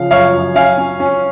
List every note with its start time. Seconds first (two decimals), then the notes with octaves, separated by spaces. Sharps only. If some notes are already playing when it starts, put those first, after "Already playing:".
Already playing: C#3 F3 F5
0.11 F#2 C#5 F5
0.33 F#2
0.55 C#4 F5 G#5
0.78 C#4
1.00 C#4